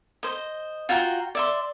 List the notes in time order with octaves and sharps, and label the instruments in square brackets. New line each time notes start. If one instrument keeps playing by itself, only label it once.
[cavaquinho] C5 D#5
F4 F#4 G5 A#5
D5 E5 C6